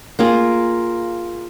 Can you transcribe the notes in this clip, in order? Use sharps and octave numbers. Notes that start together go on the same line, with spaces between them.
A#3 F4 G#4